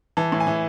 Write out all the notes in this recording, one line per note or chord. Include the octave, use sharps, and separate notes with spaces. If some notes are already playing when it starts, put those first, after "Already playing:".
E3 A5
A2
G#5
E3